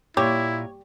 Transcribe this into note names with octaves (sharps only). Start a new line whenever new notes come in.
A#2 G3 E4 G4 C#5